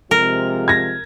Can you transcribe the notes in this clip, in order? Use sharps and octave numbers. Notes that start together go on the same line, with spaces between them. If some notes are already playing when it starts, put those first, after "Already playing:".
C3 F3 G#3 A#4
G#6 A#6